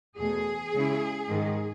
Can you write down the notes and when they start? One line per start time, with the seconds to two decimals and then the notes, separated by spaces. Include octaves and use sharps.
0.17 E2 B2 A3 G#4
0.73 C#3 G#3 C#4 E4
1.28 G#2 D#3 G#3